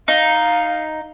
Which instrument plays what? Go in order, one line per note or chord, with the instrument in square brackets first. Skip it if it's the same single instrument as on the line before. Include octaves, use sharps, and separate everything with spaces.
[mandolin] D#4 [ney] F5